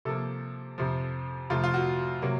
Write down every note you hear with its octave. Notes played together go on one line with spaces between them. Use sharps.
C3 F3 A#3 A4
F2 C3 F3
F2 C3 F3 A3 F4
F4
F#4
C3 F#3 A#3